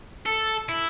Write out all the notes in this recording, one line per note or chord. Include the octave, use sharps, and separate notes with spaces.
A4
E4